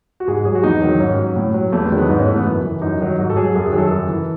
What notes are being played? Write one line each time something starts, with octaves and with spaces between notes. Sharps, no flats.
F#4
G#2 G#4
F#3 G#4
F#4
E2 D#4
D#3 F#3
G#2 C#4
F#3
A2
F#3
E2 A3
G#3
D#3 F#3
B3
G#2 D#4
C#4
E3 A3
B3
F#2
E3
F#2 D#4
D#3 F#3
G#2 F#4
A4
F#3 G#4
F#2 A4
G#4
D#3 F#3
A4
F#2
E3